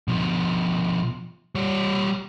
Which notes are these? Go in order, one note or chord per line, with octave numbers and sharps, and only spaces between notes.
B2 F3
G3 C#5